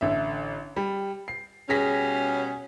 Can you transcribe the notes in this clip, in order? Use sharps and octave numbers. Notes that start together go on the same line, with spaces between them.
A1 D3 E5
G3
C7
B2 G3 C#4 G#4 A#6 B6